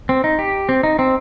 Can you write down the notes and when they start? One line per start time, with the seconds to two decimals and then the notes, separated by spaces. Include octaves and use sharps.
0.09 C4
0.24 D#4
0.39 G4
0.69 C4
0.83 D#4
0.99 C4